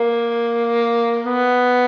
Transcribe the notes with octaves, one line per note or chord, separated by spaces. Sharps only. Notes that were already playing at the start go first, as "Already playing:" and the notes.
Already playing: A#3
B3